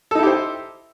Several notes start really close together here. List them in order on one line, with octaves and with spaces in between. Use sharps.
A4 D#4 E4 G4 C5